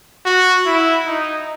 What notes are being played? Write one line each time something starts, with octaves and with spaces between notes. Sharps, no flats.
F#4
E4
D#4